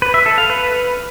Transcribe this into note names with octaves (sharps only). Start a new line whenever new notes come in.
B4
E5
A4
F5
B4